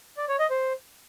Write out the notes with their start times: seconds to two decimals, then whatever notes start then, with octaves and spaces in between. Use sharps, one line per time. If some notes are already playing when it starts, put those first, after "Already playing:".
0.17 D5
0.28 C#5
0.39 D#5
0.50 C5